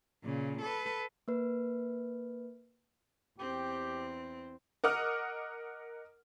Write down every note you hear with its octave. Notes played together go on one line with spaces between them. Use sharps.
A#2 C#3
A4 B4
A#3 B4
E2 C4 G4
A#4 D#5 F#5 D6 D#6 F6